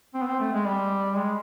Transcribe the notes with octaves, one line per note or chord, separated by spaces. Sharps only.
C4
B3
C4
A3
G#3
G3
G#3